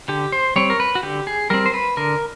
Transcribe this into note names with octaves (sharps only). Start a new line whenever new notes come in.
D3 G4
C5
G3 C4 C#5
A#4
B4
F#4
D3 G4
G#4
G3 C4 A#4
C5
B4
D3 A#4